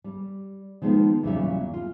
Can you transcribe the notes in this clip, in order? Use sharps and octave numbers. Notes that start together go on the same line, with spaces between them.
G3
D#3 F3 G#3 A#3 B3 D#4
E2 A#2 C#3 F#3 G3 E5
F4